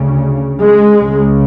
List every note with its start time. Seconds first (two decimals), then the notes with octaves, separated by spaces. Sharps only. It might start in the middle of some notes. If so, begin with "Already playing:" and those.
Already playing: D2 C#3
0.59 G#3
0.98 C#2 C#3